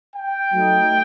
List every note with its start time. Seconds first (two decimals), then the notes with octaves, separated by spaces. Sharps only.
0.14 G5
0.52 F#3 A3 D#4